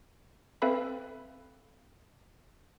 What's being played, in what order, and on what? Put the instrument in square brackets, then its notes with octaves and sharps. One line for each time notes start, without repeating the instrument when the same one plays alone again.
[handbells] C4 A4 B4 E5 F5 B5